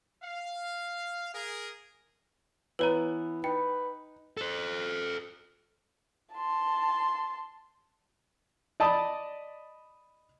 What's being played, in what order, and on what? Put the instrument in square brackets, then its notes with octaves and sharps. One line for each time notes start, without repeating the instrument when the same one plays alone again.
[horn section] F5
G#4 A#4
[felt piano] E3 B3 E4 [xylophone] B4 C#5 A#5
[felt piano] D#4 [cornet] B4 [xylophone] G5
[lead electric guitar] A4 C5
[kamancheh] A5 C6
[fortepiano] D5 D#5 A5 B5 D#6